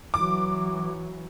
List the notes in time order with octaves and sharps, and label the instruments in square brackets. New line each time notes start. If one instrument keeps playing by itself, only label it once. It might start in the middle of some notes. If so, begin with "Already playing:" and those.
[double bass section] E3 F#3 [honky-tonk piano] D6